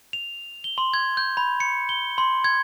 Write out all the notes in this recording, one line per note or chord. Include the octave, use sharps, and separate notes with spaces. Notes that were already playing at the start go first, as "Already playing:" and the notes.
F7
G7
C6
G#6
G6
B5
C#7
G7
C6
G#6